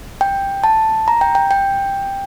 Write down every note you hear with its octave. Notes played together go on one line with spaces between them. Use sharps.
G5
A5
A#5
G5
G5
G5